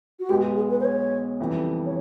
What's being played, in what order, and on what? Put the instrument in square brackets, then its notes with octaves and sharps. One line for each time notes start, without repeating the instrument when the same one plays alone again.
[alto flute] F#4
[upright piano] B1 B2 G#3 B3 [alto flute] G4
[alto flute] G#4
B4
C5
C#5
[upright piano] F1 F2 C#3 E3 G3
[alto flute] C#5